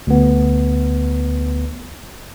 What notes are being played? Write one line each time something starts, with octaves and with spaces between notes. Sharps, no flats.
D2 B3